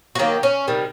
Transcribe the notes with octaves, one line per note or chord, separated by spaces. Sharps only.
F#4
D#3 F#3 A#3 G4
C#4
C3 D#3 G3